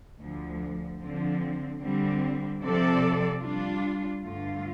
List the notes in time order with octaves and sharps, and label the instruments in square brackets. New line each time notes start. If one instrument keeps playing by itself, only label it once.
[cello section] D2 D3 F3
D3 F3 C4
D3 G3 C4
C3 F3 C4 A4 D5
G3 D4 F4
G2 D3 A3 F4